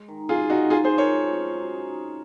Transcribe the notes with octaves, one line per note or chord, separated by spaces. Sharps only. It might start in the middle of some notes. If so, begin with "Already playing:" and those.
Already playing: G#3
D#3
F#2 F4 G#4
D#3 D#4 F#4
F3 F4 G#4
G#4 C5
F3
A#4 C#5
G#3
C#4
F#3
D#4